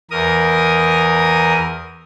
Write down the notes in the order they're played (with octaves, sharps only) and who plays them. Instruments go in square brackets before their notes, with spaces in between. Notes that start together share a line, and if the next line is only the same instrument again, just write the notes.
[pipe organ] E2 A#4 D#6